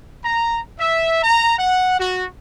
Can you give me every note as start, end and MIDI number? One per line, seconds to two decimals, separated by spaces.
0.24 0.60 82
0.79 1.19 76
1.23 1.57 82
1.58 1.98 78
1.98 2.24 66